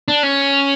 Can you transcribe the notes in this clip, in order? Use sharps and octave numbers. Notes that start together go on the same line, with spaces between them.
D4
C#4